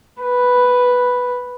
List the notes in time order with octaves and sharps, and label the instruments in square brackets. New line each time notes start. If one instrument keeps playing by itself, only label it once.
[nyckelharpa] B4